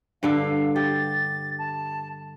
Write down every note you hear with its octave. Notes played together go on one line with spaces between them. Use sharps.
G2 D3 A4 F5
G4 A6
A5